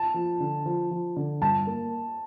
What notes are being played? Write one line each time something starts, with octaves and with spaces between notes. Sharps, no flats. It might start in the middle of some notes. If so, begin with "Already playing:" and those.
Already playing: A5
F3
D3
F3
F3
D3
G2 A5
A#3